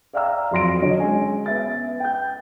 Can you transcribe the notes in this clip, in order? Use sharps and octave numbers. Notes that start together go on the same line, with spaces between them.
D5 E5 F5 G5 A#5 E6
F2 F#3 C6 A#6 D7
D3 F#3 C#5 D#5
G#3 C#4 G#5
B3 E5 A6
G5 G6